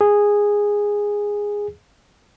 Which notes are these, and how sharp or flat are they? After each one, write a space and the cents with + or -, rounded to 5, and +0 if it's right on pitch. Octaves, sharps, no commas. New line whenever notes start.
G#4 -10